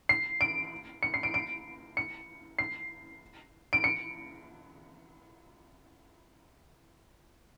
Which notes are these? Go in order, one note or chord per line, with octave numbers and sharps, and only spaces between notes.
C7
D7
C#7
C7
D7
D7
C#7
C7
D7
C#7